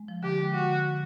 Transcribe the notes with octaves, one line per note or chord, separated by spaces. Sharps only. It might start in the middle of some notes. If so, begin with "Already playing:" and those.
Already playing: G#3
F3
D3 G4
G#3
D3 F#4
D3
D3